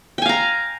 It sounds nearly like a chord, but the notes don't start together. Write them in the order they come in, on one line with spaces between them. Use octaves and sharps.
G5 G#5 F5 A#5